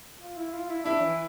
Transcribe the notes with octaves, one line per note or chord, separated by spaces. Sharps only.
F4
E4
F4
E4
D4 E4
E3